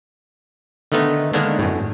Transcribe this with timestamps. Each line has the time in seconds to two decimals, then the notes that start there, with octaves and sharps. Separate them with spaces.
0.92 D3 D#3 A3 B3 D#4
1.33 D3 D#3 G#3 A#3 B3 D4
1.59 F#2 A2